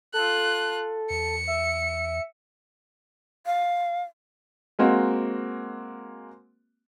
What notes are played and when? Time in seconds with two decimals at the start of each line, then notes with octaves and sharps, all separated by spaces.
0.14 F4 A4 F#6
1.10 E2 C#7
1.47 E5
3.46 F5
4.79 G#3 A#3 C4 F#4